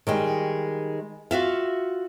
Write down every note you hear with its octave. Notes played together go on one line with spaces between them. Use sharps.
D#3 G3 G#3
F4 F#4 E5 F5